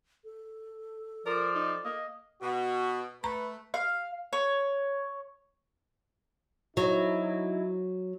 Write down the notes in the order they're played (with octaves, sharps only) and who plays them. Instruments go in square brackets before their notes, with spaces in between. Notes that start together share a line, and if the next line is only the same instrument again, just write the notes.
[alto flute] A4
[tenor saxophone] F3 [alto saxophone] A#4 [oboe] D5
[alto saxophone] D#4
[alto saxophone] A#3 [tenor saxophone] D#5
[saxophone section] B2 [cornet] F#4
[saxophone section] A3 [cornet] B4 [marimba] A#5
[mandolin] F5
C#5
[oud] F#3 [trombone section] D#4 E4